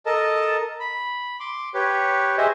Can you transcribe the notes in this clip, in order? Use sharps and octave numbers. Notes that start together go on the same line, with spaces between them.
A4 A#4 D#5 A5
B5
C6 D6
G4 B4 C#5
G#4 C5 D#5 E5